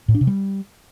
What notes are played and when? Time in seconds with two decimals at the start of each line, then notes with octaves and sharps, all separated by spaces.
0.08 A2
0.15 D4
0.21 C3
0.27 G3